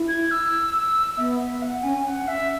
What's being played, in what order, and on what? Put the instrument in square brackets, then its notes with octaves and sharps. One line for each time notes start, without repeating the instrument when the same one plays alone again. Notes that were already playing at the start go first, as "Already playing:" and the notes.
Already playing: [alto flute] E4
[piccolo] G#6
E6
[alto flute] B3 [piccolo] E5
[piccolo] E5
F#5
[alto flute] C#4 [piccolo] G#5
[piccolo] F#5
[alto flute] C#4
[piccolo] E5